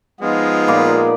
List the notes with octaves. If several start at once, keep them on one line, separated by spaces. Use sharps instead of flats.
F3 G#3 B3 D#4 F4
A#2 D5 B5